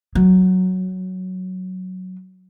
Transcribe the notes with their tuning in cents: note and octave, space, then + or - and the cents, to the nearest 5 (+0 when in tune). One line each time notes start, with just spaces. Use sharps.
F#3 +0